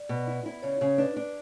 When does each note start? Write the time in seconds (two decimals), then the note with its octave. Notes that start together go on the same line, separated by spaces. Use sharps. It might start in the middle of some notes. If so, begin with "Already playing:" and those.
Already playing: D5
0.09 B2
0.27 E4
0.46 E4
0.63 C#3 C#5
0.81 C#3
0.98 D4 B4
1.16 D4